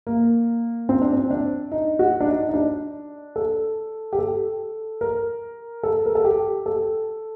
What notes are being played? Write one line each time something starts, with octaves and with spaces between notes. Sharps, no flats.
A#3
C4
D4
C4
D4
D#4
F#4
D4
D#4
D#4
D4
A4
G4
A4
A#4
A4
A#4
A4
G4
A4